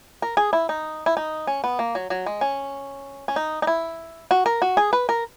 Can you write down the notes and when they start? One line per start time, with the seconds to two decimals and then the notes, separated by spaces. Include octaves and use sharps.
0.22 A#4
0.37 G#4
0.53 E4
0.69 D#4
1.06 E4
1.17 D#4
1.47 C#4
1.64 B3
1.79 A#3
1.95 F#3
2.10 F#3
2.26 G#3
2.41 C#4
3.28 C#4
3.36 D#4
3.62 D#4
3.67 E4
4.31 F#4
4.46 A#4
4.62 F#4
4.77 G#4
4.93 B4
5.09 A#4